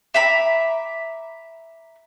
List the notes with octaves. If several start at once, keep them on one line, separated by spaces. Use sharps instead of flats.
E5 A#5 B5 D6